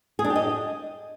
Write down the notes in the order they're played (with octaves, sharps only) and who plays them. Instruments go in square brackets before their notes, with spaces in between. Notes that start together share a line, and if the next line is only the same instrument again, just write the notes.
[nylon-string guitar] G#4
D4
G4
D#5